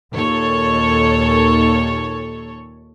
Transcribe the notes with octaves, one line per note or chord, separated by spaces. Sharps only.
D#2 A#2 A4 C#5